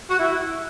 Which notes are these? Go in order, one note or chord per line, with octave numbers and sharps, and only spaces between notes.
F#4
E4